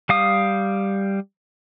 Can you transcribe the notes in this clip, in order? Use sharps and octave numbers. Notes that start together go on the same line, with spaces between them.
G3 F5 D#6